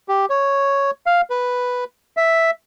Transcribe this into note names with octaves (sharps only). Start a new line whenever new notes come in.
G4
C#5
F5
B4
E5